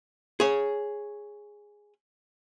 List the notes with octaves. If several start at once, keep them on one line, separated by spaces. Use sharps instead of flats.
G#4 C#5